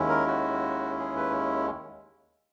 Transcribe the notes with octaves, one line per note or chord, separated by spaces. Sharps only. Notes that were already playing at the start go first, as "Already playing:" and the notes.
Already playing: D#2 D#3 G#3 C#4 E4
A#4
F#4
G#4
B4